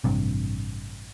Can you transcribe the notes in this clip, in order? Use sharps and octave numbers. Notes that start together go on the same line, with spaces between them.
A1 G2 C3